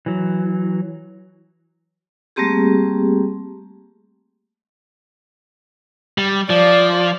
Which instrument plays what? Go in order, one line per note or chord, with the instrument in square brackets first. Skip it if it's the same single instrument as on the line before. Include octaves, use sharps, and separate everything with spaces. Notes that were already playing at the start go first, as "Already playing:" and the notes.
[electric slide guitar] E3 F#3
[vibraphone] G3 A3 A#3 C4 G4 G#4
[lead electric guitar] G3
[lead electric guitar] F3 [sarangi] D5